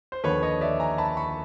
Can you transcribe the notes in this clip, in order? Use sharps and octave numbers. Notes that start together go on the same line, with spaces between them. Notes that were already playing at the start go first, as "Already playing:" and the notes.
C5
D#2 D3 F3 B4 C#5
C#5 D#5
D5 E5
G#5 A#5
A5 B5
B5 C#6